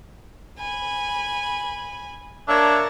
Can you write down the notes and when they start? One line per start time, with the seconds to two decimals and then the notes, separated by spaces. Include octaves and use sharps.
0.59 G#5 B5
2.48 A#3 D4 A#4 C#5 E5 A5